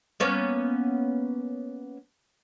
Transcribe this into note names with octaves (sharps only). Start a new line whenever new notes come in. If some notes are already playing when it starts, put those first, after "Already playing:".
A#3 B3 C#4